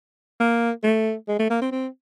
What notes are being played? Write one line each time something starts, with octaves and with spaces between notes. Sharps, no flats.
A#3
A3
G#3
A3
A#3
C4
C4